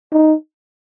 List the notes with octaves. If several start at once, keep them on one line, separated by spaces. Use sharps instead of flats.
D#4